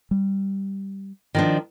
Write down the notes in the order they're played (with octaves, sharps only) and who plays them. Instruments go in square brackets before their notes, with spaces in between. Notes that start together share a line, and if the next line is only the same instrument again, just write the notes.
[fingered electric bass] G3
[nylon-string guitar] D#3 F3 D4